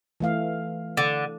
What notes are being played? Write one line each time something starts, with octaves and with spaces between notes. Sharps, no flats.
E3 A3 F5
D3